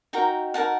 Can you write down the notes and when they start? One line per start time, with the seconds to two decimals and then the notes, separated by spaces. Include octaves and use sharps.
0.13 D#4 F#4 A#4 G5 A#5
0.54 D#4 F#4 A#4 F#5 A5